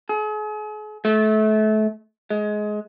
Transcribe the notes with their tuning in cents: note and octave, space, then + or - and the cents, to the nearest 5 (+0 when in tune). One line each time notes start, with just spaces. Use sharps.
G#4 +40
A3 -30
G#3 +20